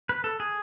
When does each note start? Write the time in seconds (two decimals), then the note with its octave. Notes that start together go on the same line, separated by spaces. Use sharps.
0.09 B4
0.24 A4
0.40 G#4